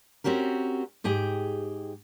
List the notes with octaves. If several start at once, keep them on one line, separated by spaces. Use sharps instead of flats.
C4 C#4 F#4 G4 A#4
G#2 G4 G#4 G5